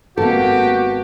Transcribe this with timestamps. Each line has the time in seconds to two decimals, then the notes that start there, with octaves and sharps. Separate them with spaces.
0.18 G#1 A#3 B3 F#4 G4 A4